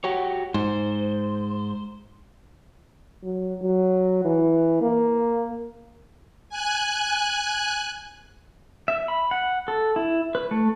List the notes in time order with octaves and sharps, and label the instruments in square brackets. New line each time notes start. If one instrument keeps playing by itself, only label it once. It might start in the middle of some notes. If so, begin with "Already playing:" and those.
[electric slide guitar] F#4 G4 C#5
[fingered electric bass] G#2 [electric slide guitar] C5
[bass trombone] F#3
F#3
E3
A#3
[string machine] G#5 F#6
[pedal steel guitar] E5
B5
F#5
A4
E4
B4
A3